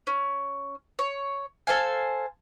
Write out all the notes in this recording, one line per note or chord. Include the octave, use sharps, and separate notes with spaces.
C#4
C#5
A4 C5 F5 G#5